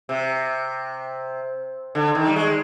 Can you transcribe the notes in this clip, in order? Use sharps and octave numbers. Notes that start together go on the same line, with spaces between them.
C3
D3
D#3
G3
G#3